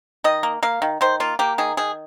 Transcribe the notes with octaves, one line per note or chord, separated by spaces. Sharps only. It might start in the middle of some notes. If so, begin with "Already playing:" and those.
D#3 D#5
A#3
A#3 F5
D#3
D#3 C5
A#3 F4
A#3 G4
D#3 G#4
D#3 G#4